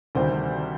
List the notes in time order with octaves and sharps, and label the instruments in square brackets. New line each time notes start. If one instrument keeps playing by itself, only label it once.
[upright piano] D2 C3 D#3 G3 C4 C5